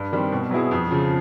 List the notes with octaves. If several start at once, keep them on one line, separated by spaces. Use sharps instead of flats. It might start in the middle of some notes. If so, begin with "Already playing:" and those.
Already playing: G2
D#3 G3 C4
B2
F#3 B3 E4 G#4
F2
C#3 F3